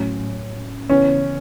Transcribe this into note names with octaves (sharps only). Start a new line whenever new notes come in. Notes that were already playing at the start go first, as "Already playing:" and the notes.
Already playing: A2 F#3 C#4
C#3 E3 B3 C#4